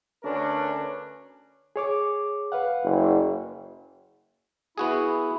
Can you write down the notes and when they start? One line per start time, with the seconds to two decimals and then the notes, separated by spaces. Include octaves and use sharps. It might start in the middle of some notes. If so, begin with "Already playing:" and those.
0.24 D2 D3 C#4 D4 A#4 B4
1.76 G#4 C#5 D6
2.52 B4 F5 F#5
2.83 F#1
4.78 B3 E4 F#4 G#4